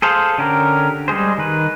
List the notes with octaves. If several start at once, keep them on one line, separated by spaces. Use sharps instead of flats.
G#4 A4 C5 F5
D3 C#4 G4 A#4
G3 G#3 G#4 C5
D#3 B4